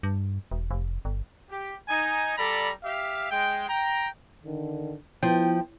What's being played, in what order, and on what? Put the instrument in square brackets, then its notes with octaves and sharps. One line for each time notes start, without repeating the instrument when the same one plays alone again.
[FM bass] G2
E1
F1
G1
[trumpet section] G4
D#4 G#5
G3 A4 D5 A#5 B5
G4 E5 F5
G#3 G5
G5 A#5
[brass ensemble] D3 D#3
[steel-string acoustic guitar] F3 [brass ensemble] B3 E4 [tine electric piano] G5